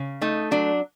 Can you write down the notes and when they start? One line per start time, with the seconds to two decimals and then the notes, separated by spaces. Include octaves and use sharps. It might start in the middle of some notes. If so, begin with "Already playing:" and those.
Already playing: C#3
0.21 A3 D#4
0.51 F#3 D4